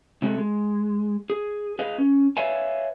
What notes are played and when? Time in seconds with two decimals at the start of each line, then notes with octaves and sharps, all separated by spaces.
0.22 C3 G#3 F#4 G4 A4
0.38 G#3
1.30 G#4
1.79 G#4 B4 D#5 F5
1.98 C#4
2.37 B4 C#5 D5 E5 F5 G#5